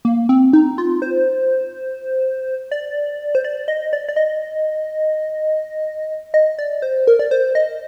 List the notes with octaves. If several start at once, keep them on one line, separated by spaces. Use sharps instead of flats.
A#3
C4
D#4
F4
C5
D5
C5
D5
D#5
D5
D5
D#5
D#5
D5
C5
A#4
D5
C5
D#5